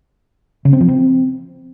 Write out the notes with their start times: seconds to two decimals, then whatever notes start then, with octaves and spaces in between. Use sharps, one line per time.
0.65 C#3
0.73 C4
0.81 F3
0.88 C4